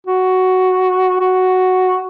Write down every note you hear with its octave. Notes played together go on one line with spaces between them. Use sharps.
F#4
F#4